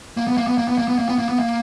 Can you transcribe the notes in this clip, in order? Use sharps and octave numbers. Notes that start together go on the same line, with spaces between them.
A#3
B3
A#3
B3
A#3
B3
A#3
B3
A#3
B3
A#3
B3
A#3